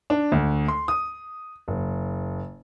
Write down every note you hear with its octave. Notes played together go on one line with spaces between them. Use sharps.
D4
D2
C6
D#6
F#1